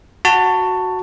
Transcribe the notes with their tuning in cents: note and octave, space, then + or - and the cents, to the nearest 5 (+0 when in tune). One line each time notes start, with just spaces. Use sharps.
F#4 +0 A5 +15